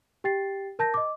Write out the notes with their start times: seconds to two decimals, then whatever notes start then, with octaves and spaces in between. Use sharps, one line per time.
0.24 G4 G5 A6 C7
0.79 A#4 A5 G6 A#6
0.94 D#5 D6